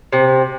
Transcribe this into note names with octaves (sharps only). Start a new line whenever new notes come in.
C3